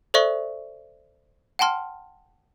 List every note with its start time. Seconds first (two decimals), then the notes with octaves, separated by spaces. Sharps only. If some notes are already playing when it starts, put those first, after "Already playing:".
0.14 A4 C5 D5 E5 C#6
1.59 F#5 G5 A5 C6 F6